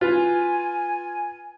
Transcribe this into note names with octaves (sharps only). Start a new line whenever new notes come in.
F4 B4 G#5